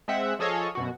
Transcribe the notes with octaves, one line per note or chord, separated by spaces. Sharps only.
G#3 C4 E5 F#5
F3 G#4 A4 C#5 D#5 F5
F#2 B2 F#4